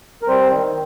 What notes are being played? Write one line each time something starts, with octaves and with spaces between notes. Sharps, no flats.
A#4
G3 C4 C5
D#3